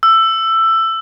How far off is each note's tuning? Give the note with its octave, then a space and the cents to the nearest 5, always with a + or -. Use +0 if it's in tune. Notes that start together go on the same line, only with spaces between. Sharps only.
E6 +15